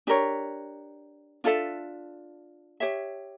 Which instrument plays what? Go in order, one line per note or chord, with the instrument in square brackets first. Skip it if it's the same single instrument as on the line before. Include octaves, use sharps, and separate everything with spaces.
[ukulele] D4 G4 A#4 C#5
D4 F4 A4 E5
G4 C#5 E5